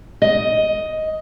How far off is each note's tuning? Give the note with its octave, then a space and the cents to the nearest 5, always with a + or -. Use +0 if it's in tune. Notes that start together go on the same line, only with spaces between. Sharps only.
D#5 +10